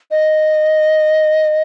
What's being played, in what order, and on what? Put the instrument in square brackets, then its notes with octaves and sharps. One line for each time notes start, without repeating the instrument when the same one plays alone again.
[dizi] D#5